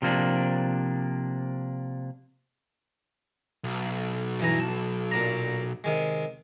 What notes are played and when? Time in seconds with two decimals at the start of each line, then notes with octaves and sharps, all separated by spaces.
0.02 C3 F3 A#3 D4
3.64 B1
4.40 G2 E3 A#5
4.60 A5
5.11 A#2 D4 A#5
5.84 C3 D#3 G#3